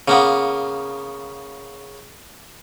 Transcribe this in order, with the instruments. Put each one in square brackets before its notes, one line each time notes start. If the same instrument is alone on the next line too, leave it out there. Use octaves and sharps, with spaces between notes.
[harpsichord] C#3 A#3 B3